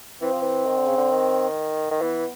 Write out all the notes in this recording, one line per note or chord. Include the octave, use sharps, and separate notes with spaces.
E3 C4
F3
E3
D#3
D3
C#3
D3
D#3
D#3
E3 B3